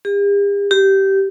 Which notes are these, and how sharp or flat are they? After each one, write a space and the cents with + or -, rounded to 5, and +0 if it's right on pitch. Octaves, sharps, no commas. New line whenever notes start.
G4 +45
G4 -15